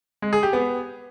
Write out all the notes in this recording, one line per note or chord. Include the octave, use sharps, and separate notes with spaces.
G#3
G#4
G4
B3